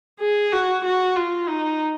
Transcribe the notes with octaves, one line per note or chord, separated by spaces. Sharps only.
G#4
F#4
F#4
F4
D#4